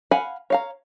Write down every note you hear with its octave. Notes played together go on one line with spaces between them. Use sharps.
F5 F#5 G#5 B5
C#5 F5 A#5